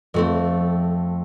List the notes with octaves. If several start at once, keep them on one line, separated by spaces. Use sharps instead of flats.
F2 A3 C4